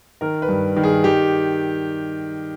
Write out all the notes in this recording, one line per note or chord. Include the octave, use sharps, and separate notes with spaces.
D#3 A#4
B4
G2
D#3
G#4
D#3 G4